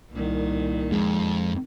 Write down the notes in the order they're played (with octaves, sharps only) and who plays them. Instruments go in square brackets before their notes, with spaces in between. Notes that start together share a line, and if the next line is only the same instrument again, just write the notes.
[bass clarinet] C2 [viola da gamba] A#2 D#3
[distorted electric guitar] F2 [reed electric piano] G#3